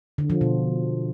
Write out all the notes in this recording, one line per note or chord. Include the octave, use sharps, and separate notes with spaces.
D3
F3
B2